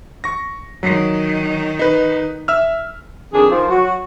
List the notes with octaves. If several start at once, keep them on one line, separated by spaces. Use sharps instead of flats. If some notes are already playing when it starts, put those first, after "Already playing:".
C#6 A#6
D#3 F#3
D#4 B4
E5 E6 F6
F2 D#3 D4 G#4
D#3 F3
F#3 F#4